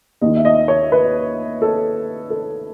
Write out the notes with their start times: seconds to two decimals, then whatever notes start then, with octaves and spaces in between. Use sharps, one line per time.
0.21 D#2 D#3 D#5
0.36 E5
0.45 D#5
0.68 C#5
0.92 B4
1.62 A4
2.30 A4